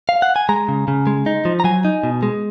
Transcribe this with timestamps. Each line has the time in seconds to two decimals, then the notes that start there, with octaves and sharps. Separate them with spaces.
0.09 F5
0.22 F#5
0.36 G#5
0.49 G#3 A#5
0.69 C#3
0.88 C#3
1.07 G#3
1.26 D#4
1.45 F3
1.60 A#5
1.64 F#3 G#5
1.85 D#4
2.03 B2
2.23 G#3